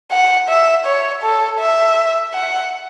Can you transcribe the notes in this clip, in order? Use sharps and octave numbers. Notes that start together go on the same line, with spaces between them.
F#5
E5
C#5
A4
E5
F#5